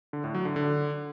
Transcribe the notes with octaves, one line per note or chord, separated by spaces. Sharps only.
D3
A2
F#3
D3
D3